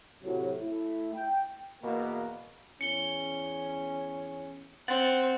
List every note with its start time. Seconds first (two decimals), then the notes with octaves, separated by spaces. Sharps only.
0.23 A2 C3 F#3
0.60 A3 E4
1.14 G5
1.83 E2 B2 A#3
2.81 E2 C#4 C#7 G7
4.88 C4 F#5 A6 F#7